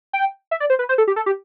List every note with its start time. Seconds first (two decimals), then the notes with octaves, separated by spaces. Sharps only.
0.13 G5
0.51 E5
0.60 D5
0.70 C5
0.79 B4
0.89 C5
0.98 A4
1.08 G4
1.16 A4
1.26 G4